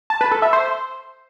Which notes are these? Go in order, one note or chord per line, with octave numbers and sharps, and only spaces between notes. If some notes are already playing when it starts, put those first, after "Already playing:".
A5
B4
A4
E5
C5